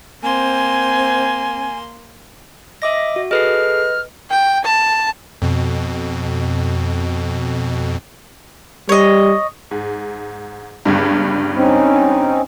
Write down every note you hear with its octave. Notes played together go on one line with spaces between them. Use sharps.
A#3 C4 G#5 C6
D#5 E5 D6 A#6
F#4
G#4 A4 B4 D#5 F6 C7
G5
A5
F2 B2
G3 C#5 D#5
G#2
G1 C#2 G2
C4 C#4 D#4